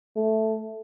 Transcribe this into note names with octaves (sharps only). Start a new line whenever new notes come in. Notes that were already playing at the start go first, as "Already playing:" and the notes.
A3